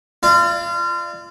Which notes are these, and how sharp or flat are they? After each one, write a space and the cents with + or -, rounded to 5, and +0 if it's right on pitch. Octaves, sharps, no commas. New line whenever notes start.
F4 -30 D5 +30